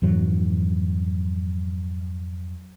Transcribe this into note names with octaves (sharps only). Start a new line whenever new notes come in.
F2 G#2 E3 F#3